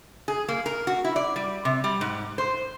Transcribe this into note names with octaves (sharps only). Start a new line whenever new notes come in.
G#4
A#3
A#4
F#4
E4
D5
G3
C3
G3
G#2
C5